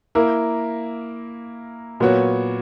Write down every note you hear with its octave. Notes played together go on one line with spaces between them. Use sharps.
A#3 E4 A#4
A#2 F#3 B3 F#4 C#5